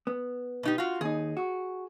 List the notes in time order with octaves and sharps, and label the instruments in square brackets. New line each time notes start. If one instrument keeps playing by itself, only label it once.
[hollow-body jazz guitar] B3
[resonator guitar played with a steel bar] B2 D#4 G4
F4 F#4
[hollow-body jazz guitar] D#2 D#4 [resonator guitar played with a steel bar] G#4
[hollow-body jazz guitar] F#4